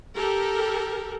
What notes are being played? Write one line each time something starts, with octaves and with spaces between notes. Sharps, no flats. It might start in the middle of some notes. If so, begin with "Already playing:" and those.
G4 A4 A#4